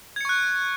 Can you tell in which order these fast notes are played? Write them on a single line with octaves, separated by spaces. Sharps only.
G#6 C#7 C#6 F#6